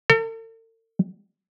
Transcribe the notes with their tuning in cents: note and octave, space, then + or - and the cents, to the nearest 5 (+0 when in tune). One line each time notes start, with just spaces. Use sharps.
A4 +45